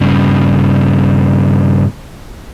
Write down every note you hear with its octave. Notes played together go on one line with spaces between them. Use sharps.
G2 C#3